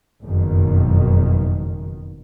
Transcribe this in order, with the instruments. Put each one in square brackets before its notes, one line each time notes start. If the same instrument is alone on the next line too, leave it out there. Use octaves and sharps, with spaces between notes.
[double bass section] F#1 F2 B2 D#3